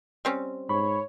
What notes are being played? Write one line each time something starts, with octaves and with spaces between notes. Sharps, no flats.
G3 C4 C#4
G#2 C#5 B5 C#6